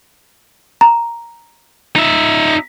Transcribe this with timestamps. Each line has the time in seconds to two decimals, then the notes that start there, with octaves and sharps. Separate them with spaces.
0.81 A#5
1.96 D#4 E5